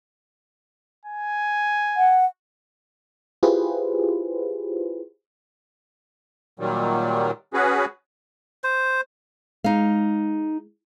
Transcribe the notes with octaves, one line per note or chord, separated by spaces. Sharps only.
G#5
F#5
E4 F4 G4 G#4 B4 C5
A#2 D#3 F#3 G3
C#4 F#4 G#4 B4
C5
G#3 D#4 F5